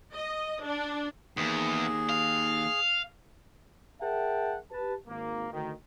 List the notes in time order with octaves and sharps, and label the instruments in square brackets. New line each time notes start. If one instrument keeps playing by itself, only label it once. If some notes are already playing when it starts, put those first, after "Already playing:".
[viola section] D#5
D4
[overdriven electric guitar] E2 [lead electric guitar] D#3 A#3 [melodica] G#4
[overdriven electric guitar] F5
[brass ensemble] G#4 A#4 E5 F#5 G5 A5
G4 B4 A5
G#1 A#3
D2 D#3